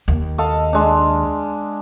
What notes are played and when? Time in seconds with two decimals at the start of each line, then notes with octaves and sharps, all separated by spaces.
0.08 D#2
0.38 A4 D#5 F5
0.73 G#3 D4